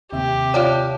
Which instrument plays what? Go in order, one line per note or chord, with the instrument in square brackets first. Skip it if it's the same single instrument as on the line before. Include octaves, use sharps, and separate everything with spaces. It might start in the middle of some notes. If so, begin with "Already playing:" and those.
[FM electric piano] D#2 C3 E5 [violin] G4
[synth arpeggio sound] F4 D5 D6 [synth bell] C#5 A5